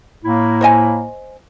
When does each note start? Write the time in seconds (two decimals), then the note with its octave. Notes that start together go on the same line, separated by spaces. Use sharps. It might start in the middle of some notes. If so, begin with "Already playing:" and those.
0.24 A2 A#3 E4
0.61 C5 D#5 G#5